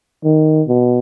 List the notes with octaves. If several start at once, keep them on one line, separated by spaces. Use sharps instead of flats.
D#3
B2